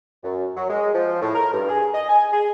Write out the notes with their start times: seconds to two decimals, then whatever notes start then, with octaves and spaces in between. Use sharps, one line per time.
0.24 F#2
0.57 F#3
0.69 G#3
0.95 F3
1.22 A2
1.35 A#4
1.53 G2
1.69 G#4
1.94 D#5
2.09 G#5
2.33 G#4